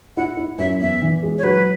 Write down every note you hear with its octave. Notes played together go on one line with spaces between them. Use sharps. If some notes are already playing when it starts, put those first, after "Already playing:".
E4 F#5
E4
F#2 E5
E2 E5
E3
G#3
C#5
F#3 B4